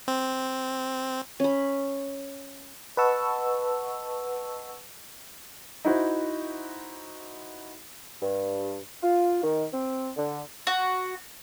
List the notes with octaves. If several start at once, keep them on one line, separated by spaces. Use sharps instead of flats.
C4
C#4 B5
B4 D#5 F#5 A5 C#6 E6
D#4 E4 F#4 C5
G2
F4
D#3
C4
D3
F#4